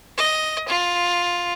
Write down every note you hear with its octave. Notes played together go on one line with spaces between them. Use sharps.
D#5
F4